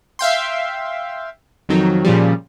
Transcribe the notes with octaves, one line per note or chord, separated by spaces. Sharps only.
E5 F5 G5 C6
F2 D#3 F#3
A#2 C#3 F3 G3